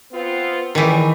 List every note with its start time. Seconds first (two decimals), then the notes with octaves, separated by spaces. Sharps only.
0.12 B3 C4 F4
0.75 D#2 A#2 D#3 E3 G#3